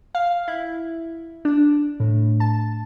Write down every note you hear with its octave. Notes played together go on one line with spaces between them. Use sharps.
F5
E4
D4
A2
A5